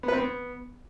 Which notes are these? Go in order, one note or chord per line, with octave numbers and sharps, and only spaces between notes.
B3
B4
C4
B3